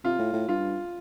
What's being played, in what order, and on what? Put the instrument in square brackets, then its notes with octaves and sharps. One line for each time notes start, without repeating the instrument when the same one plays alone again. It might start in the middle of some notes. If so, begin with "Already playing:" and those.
[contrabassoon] C3 [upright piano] F4
[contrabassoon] A2
A2
[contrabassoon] G2 [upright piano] F4